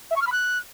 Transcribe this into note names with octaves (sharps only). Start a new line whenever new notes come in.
E5
C#6
F6
B5
F#6